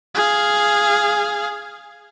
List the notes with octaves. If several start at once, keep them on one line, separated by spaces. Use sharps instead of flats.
G#4 F5